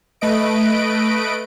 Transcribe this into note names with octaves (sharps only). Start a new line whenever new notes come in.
A3 B4 D#5 D7